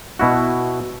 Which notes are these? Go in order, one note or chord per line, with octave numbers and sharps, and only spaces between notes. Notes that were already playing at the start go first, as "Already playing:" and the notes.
B2 E4 F#4